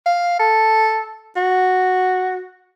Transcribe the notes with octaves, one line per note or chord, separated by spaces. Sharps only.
F5
A4
F#4